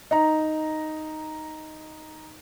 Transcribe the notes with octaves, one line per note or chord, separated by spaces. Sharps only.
D#4 A#5